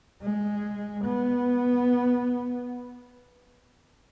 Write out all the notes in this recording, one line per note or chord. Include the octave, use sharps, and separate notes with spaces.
G#3
B3